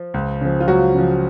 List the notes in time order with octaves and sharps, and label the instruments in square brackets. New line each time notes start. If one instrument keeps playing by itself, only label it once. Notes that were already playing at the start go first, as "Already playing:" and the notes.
Already playing: [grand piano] F3
C#2
C#3 F3
F4
C#2 F#3 F#4
C#3 F3